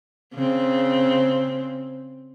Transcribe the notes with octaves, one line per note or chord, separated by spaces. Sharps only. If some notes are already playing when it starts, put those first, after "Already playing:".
C#3 C4